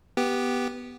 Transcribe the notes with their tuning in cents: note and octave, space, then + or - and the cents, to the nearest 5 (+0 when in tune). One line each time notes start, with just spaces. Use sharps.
B3 -5 G4 +0